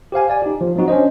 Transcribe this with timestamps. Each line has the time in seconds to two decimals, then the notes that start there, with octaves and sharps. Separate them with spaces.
0.12 G4 C5 F5 G#5
0.30 D5 G#5
0.42 D#4 G4
0.61 F3
0.76 F3 F#3 C4 D#4 F#4
0.88 C#4 D4 C5 D#5